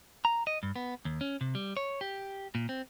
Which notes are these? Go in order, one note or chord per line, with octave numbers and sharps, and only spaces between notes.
A#5
D#5
G2
B3
D#2
C#4
C3
G3
C#5
G4
A#2
C4